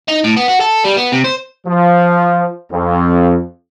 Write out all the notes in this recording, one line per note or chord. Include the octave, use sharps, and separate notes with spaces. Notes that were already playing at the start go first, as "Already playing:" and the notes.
D#4
A2
B3
F#4
A4
G3
B3
C3
C5
F3
F2